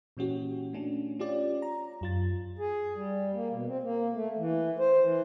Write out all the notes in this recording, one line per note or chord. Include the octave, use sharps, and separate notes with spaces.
A#2 E3 C#4 F#4 G4
A3 C#4 D4
C#4 F4 G4 D5
A#5
F#2 F4 A6
G#4
G3
A#3
B2
C4
A#3
A3
E3
C5
E3